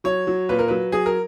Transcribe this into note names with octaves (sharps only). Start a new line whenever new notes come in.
F#3 C#5
F#3
A#2 B4
A#4
F#3 B4
F#3 G#4
A#4